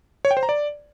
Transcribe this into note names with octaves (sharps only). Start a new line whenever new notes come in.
C#5
G5
C5
A#5
D5